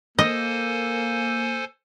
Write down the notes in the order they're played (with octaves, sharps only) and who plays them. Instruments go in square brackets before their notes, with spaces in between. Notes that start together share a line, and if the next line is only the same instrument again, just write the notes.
[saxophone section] A#3 [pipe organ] A4 C5 G#5 [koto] D#5